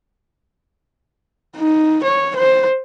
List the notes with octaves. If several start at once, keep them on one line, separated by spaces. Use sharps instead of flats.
D#4
C#5
C5